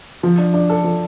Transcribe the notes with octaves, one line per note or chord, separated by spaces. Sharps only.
F3
D4
D4
A4
F3